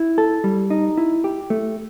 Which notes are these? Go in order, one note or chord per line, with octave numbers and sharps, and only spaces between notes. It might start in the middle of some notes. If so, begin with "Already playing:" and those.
Already playing: E4
A4
G3
D#4
E4
G4
A3